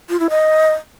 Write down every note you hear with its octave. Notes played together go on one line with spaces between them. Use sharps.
F4
E4
D#5